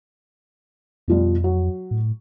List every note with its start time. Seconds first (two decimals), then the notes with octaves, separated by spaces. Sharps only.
1.08 F2 B2 F3 G3
1.44 F#3
1.91 A2